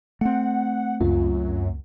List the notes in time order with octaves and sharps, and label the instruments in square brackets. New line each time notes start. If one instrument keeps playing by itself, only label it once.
[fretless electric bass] A3 C4 [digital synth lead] F#5
[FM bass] C#2 [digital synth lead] F#2 [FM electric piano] F4